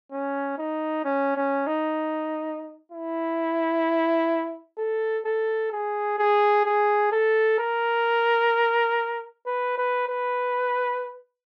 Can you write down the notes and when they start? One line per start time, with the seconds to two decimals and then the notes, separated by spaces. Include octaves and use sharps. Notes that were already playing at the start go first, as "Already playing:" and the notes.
0.12 C#4
0.58 D#4
1.05 C#4
1.36 C#4
1.67 D#4
2.92 E4
4.78 A4
5.25 A4
5.72 G#4
6.19 G#4
6.65 G#4
7.12 A4
7.59 A#4
9.46 B4
9.78 B4
10.08 B4